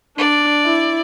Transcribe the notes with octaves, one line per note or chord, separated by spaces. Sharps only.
D4 D5
E4